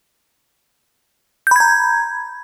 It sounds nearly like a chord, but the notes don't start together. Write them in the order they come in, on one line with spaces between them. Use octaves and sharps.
G6 B5 G#6 A#5